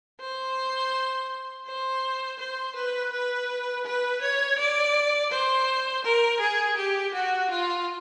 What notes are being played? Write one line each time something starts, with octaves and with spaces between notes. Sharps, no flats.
C5
C5
C5
B4
B4
B4
C#5
D5
C5
A#4
G#4
G4
F#4
F4